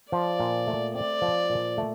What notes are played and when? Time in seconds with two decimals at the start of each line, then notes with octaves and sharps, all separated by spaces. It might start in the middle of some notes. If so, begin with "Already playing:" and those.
0.12 F3 D5
0.40 A#2
0.67 A3
0.94 C4 D5
1.22 F3
1.50 A#2
1.78 A3